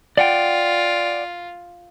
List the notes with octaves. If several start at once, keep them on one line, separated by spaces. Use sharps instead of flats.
F4 D5 F#5 G5